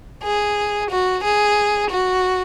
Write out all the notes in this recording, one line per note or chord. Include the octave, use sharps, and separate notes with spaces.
G#4
F#4
G#4
F#4